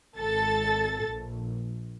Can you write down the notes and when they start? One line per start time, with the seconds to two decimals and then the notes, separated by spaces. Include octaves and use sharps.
0.18 G#1 A4 A6
1.07 A#1